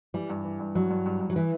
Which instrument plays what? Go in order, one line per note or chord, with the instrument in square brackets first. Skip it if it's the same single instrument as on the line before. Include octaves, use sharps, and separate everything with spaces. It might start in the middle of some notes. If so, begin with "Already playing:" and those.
[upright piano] E3 [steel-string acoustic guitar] G3
[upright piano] G2
E3
G2
[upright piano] G2 [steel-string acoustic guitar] F#3
[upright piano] G2
G2
G2
[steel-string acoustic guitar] F#3
[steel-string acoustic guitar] E3 [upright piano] B4